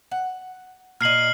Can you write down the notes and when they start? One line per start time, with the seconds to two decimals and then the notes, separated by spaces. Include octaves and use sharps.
0.11 F#5
1.01 A#2 D#5 F6 C7 F#7